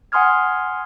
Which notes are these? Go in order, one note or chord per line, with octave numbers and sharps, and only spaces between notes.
F#5 G#5 C6 D#6 F6 G#6